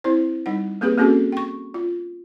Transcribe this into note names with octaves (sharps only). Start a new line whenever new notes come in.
C4 E4 C5
G3 D#4 F#5
A#3 C4 G4 G#4 B4
A#3 C4 C#4 F#4 G#4 A4
G5 C#6
F4